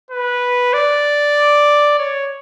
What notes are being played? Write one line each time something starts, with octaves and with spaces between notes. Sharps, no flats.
B4
D5
C#5